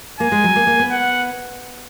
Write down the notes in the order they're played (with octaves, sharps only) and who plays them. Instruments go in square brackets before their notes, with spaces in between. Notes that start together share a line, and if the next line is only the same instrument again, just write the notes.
[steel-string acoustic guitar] A#3 [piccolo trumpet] G#5
[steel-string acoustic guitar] G#3
F#3
A#3
A#3
B3
[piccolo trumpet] F#5